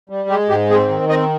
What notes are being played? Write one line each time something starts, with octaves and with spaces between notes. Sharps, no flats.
G3
G#3 G4
G#2 G4
C4 G#4
D#3
C4 D#5